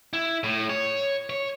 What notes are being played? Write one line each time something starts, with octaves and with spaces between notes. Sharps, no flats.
E4
A2
C#5
C#5